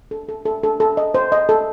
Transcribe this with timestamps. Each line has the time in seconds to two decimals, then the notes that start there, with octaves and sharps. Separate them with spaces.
0.11 A4
0.29 A4
0.45 A4
0.63 A4
0.80 A4
0.97 D#5
1.14 C5
1.32 D#5
1.49 A4